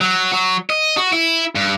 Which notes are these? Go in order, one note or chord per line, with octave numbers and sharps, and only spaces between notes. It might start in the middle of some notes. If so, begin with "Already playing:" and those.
F#3
F#3
D#5
F#4
E4
G2